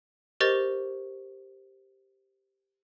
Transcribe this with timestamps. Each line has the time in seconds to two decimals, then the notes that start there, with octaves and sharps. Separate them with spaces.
0.40 G4 A#4 C5 D#5 C#6 A6